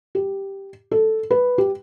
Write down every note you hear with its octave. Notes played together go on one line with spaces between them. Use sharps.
G4
A4
B4
G4